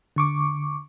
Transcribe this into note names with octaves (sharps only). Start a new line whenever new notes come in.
D3 C#6 D6